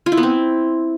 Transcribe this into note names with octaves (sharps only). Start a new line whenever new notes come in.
F4
E4
B3
C4